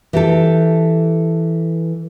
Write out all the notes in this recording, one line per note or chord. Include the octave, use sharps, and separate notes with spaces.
E3 G4 A4